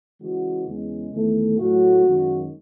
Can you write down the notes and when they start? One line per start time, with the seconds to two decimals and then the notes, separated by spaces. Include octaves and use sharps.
0.22 C#3 E3 G#3 F#4
0.67 E2 C#3 G#3
1.13 E2 D#3 A3
1.58 A2 F#3 A3 F#4
2.04 F#2 D#3 G#3